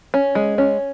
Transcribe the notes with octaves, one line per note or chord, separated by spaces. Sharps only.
C#4
G#3
C#4